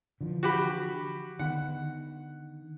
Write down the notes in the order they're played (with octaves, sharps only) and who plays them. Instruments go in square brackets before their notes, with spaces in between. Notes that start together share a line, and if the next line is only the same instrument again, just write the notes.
[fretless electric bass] D3 E3 F3
[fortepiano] F#4 G4 B5
[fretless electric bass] D3 D#3 B3 [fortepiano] F#5